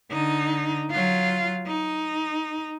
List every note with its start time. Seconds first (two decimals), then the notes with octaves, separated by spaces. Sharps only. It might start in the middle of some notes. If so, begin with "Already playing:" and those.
0.11 D3 D#4
0.90 F#3 F4
1.67 D#4